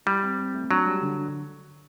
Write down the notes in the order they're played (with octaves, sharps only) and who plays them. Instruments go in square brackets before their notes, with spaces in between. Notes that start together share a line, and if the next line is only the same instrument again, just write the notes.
[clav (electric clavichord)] G3 [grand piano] E4
[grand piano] C4
C4
A3
[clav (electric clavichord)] F#3 [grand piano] D4
[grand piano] G3
D3
D3